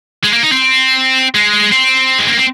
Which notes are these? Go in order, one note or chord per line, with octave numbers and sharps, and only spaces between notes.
G#3
A#3
D#4
C4
G#3
C4
G#3
A#3
C4